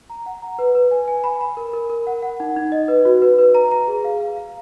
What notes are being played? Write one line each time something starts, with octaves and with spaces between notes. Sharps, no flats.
A#5
F#5
A#5
B4
B4
G#5
G#5
B5
B5
A#4
A#4
A#4
F#5
F#5
D#4
D#4
D#5
B4
F#4
B4
B4
A#5
A#5
G#4
F5
F5
F5